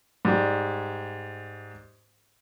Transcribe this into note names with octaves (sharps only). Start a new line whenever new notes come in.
G#2 G3